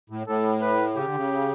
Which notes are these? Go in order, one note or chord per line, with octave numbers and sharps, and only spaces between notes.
A2
A2 A4
B4
C#3 G4
D3
C#3